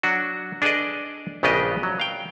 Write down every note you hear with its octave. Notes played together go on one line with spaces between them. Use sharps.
F#3 D4 F#4
D4 G#4 A4 B4 D5 D#5
A#1 C#3 B3 D4 G4 D#5
F#3
F5 G5